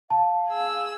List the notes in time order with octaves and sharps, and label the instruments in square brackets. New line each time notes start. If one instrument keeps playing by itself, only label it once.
[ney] F5 [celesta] A5
[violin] G#4 E6